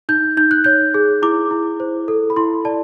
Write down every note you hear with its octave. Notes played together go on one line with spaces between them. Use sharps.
D#4 G6
D#4 G6
F#6
C#5 G6
G#4
E4 D6
E4
C5
A4
B5
E4 C6
D5 A5